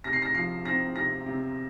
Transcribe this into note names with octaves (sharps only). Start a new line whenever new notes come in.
C3 A#6
C7
A#6
F3 C7
C4 A#6
C3 A#6
C3